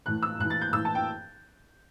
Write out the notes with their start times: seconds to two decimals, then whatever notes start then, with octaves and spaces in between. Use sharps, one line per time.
0.06 A2 E3 F#6
0.23 E6
0.39 A2 E3 F#6
0.50 A6
0.61 G6
0.73 A2 E3 E6
0.85 A5
0.95 G5